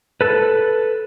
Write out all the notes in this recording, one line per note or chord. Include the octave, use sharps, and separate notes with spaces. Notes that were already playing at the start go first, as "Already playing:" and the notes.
A4 B4